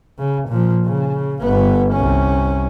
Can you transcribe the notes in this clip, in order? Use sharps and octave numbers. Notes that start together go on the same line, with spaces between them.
C#3
A#2 F3
C#3
G1 B3
C2 C#4